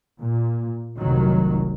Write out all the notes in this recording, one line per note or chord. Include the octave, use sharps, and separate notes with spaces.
A#2
F1 C2 D#3 F#3